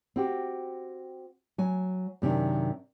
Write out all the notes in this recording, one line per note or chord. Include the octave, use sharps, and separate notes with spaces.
C4 F#4 G4
F#3 G#5
F#2 C3 D#3 D4